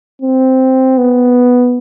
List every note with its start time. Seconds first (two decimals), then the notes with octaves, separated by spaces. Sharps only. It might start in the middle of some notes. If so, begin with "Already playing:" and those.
0.22 C4
0.98 B3